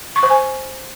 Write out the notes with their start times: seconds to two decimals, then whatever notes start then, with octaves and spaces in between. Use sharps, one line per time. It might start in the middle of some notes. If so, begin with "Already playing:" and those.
0.16 C#6
0.23 C5
0.30 G#5